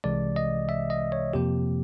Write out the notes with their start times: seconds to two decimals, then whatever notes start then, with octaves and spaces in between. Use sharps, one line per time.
0.04 C2 C3 E3 G#3 D5
0.36 D#5
0.69 E5
0.90 D#5
1.12 C#5
1.33 F2 C3 F3 A#3 G4